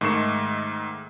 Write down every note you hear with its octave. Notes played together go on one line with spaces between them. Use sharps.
G#2 D#3 A3 C#6 C7 E7